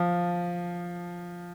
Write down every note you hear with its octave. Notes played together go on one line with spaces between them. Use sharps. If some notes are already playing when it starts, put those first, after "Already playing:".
Already playing: F3